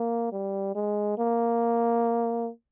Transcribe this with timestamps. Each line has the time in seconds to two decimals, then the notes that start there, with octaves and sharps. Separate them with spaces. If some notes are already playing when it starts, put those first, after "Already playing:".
Already playing: A#3
0.32 G3
0.75 G#3
1.18 A#3